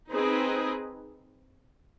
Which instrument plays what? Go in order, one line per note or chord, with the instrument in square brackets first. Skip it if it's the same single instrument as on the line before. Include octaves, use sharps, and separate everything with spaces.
[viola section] C4 D#4 G#4 B4